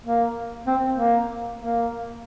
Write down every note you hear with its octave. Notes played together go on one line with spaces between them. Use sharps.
A#3
C4
A#3
A#3